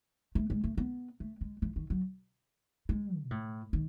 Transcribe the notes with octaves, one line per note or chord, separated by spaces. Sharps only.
A3
G#3
A3
B3
A3
G#3
E3
D#3
F#3
G#3
B2
A2
D#3